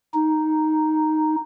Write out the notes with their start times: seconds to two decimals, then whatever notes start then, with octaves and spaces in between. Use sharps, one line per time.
0.14 D#4